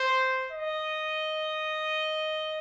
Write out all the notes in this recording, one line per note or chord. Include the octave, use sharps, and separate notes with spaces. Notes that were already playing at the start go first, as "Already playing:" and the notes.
Already playing: C5
D#5